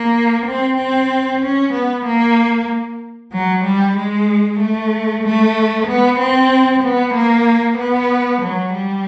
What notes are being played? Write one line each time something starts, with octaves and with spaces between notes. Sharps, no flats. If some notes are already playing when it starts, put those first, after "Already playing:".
Already playing: A#3
C4
C4
C#4
B3
A#3
F#3
G3
G#3
A3
A3
B3
C4
B3
A#3
B3
F#3
G3